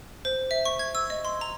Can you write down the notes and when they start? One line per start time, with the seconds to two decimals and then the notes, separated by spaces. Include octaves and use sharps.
0.25 C5
0.51 E5
0.65 C#6
0.79 G#6
0.95 E6
1.10 D#5
1.25 C6
1.41 A#5